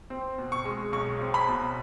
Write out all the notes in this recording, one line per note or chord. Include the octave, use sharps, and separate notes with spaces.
C4
B2
C#6
G#3
B1 C#6
C4
B5
B2